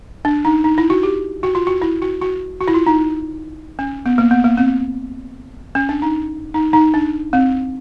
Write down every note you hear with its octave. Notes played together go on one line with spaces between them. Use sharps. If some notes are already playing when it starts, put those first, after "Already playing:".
D4
D#4
D#4
E4
F#4
G4
F#4
F4
F#4
E4
F#4
F#4
F#4
E4
F4
D#4
C#4
B3
A#3
B3
A#3
C4
C#4
D4
D#4
D#4
D#4
D4
C4